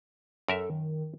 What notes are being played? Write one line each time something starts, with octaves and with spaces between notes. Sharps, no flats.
F#2 A4 A#4 E5
D#3